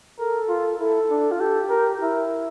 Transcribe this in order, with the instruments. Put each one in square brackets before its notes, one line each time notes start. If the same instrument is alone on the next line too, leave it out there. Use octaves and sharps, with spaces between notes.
[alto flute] A4 [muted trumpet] A#4
[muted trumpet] F4
[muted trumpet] E4 [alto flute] A4
[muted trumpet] D4
[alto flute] F4
[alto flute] G4 [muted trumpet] A4
[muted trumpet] A#4
[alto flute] E4 [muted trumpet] A#4